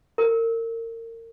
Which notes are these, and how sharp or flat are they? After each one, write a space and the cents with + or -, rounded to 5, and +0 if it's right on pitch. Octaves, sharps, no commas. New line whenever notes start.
A#4 -35